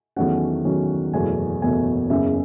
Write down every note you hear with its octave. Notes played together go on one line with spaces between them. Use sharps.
E2 D#3 F#3 A3 C#4 F#5
E2 D#3 F#3 A3 C#4
F#1 E2 B2 F#3 A3 G#5
F#1 E2 B2 F#3 A3 G#5
F#1 E2 C#3 E5